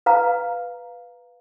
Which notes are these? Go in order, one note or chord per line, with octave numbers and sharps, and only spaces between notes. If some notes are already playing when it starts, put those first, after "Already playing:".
B4 F5 A#5